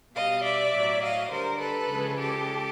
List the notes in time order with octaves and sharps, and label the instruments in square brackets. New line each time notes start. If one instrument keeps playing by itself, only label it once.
[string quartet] B2 G3 D#5 F5
D5 E5
A2 F#3
D#5 F5
D3 G3 A#4 C5
A4 B4
C#3 F3 G#3
G4 A4